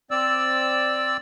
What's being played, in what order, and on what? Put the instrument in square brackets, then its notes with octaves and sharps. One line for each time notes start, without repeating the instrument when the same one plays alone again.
[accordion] C4 D5 E6